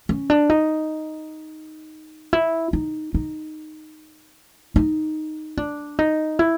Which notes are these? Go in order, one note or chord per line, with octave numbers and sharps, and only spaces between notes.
C#4
D4
D#4
E4
D#4
D#4
D#4
D4
D#4
E4